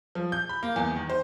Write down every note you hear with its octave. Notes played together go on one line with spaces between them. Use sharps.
F3
G6
B5
A#3
E2
D#3
C5